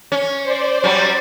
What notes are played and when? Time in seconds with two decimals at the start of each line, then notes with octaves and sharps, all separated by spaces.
0.12 C#4
0.43 C5 D5
0.84 F#3 G3 C#4